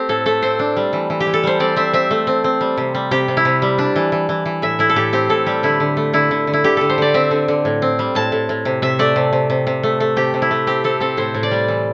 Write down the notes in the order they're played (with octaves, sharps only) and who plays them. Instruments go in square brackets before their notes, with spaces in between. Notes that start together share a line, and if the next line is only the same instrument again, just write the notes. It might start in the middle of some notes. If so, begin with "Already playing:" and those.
Already playing: [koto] A3 C4 G4
A2 A4
A3 A4
C4 C5
D4
G3
E3
E3
G4
E3
A4
G3 C5
C4 D5
C4 E5
C4 E5
A3
C4
C4
G3
C3
G3
C3 G4
C3
E4
C3
G3
D4
E3
E3
E3
E3
A2 E5
A2 E4
A4
A2 G4
C4 G4
A2 A4
G3 G4
D3 E4
D3
A3
D3 E4
D3
D3
E4
D3 G4
D3 A4
C5
D3 D5
C4 E5
D3
D3
A2
C4
G3
A2 A5
A2
A2
C3
C3 E5
A3 D5
C3
C3
C3
C3
A3
A3
C3 G4
C3
E4
A3
C4 G4
C4 A4
C4 A4
A2 C5
A2
D5
G3
E3